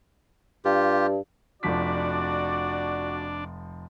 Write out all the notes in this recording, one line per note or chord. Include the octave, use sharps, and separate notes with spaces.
G2 F4 G4
F1 F3 D4 F#4 D5 B6